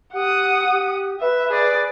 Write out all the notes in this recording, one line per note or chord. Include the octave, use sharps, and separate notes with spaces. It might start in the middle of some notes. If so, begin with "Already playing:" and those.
G4 F#5 D#6
G4
B4 E5
G#4 D5